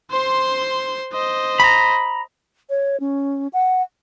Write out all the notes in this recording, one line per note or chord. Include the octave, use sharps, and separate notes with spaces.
C5 C6
C5 D#5
A#5 B5
C#5
C#4
F#5